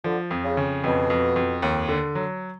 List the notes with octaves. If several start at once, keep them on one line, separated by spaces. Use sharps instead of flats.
D3 F3
F2
C#3
C#3
F2 B2
F2
F2
D#2
D3
F#3